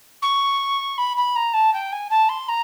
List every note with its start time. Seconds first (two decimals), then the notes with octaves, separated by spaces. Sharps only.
0.22 C#6
0.98 B5
1.17 B5
1.35 A#5
1.53 A5
1.73 G5
1.92 G#5
2.10 A5
2.29 C6
2.48 A#5